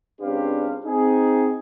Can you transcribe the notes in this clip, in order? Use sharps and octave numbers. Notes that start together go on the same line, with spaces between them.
C#2 C4 D4 G4 B4 F5
C4 D#4 G#4